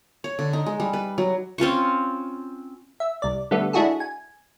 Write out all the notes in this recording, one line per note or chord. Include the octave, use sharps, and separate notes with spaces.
C#5
D3
D#4
G#3
G3
B4
F#3
C4 C#4 F4 C#6
E5
C2 D5
D3 G3 A3 B3
G#3 D4 E4 F#4 G#4 A4
G#5